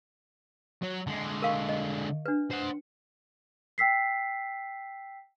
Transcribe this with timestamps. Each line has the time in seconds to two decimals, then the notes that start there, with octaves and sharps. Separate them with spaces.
0.82 F#3
1.07 D3 G#3
1.42 A#4 F5 C#6
1.69 D#5
2.26 D4 B4
2.51 C5 F#5
3.78 G5 E6 B6 C7